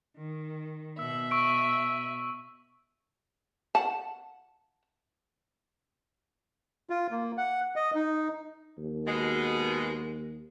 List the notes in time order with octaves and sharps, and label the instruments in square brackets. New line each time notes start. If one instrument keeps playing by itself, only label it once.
[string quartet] D#3
[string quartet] B2 E5 [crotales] E6
[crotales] C#6 E6 D7
[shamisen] F#5 A5
[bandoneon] F4
A#3
F#5
D#5
D#4
[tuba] D#2
[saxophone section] B2 G#3